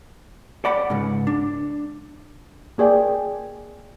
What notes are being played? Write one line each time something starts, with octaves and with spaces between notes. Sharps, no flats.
D5 F#5 B5
C#2 G#2
D4
A#3 G#4 D5 G5